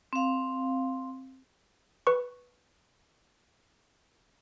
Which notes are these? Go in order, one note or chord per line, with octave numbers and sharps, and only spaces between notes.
C4 F5
B4 C#6